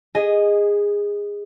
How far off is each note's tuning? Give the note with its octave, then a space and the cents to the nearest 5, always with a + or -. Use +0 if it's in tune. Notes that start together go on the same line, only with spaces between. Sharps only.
G#4 -20 D#5 +0 G#5 +0